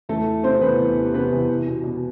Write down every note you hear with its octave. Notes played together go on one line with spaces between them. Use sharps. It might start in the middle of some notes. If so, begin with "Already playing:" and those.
E2 A3 A4
E3
C3 C4 C5
E2 B3 B4
E2
C3
C3 B3 B4
E2
E2
B2
B2